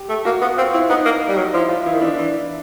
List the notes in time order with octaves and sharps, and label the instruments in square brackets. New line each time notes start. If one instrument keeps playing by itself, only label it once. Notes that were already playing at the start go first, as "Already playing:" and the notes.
Already playing: [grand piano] G4
[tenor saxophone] A3
[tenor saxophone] A#3 [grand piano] F#4
[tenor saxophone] B3 [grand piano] F#4
[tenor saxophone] C4 [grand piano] F4
[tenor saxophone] C4 [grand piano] E4
[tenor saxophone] B3 [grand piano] D#4
[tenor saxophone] A#3
G3
F#3
[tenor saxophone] F3 [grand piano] E4
[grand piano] F4
[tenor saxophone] E3 [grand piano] E4
[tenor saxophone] D#3
[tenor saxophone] E3 [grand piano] D4
[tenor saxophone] E3 [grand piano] D4